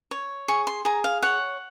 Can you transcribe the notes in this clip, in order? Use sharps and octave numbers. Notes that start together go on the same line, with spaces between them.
C#5
G#4 C#6
C6
G#4 A#5
F5
C#5 F#5